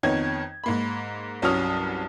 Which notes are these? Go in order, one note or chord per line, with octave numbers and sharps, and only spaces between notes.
F2 D#3 B3 D#4 C#5 G#6
G#2 A#3 B5
C2 G2 F#3 C#4 D#6 F6